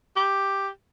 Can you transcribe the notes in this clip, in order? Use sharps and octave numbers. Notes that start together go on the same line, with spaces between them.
G4